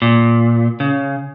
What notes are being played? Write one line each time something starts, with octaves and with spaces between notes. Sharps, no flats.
A#2
C#3